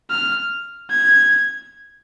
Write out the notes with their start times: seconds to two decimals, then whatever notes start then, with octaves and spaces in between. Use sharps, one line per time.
0.10 F6
0.90 G#6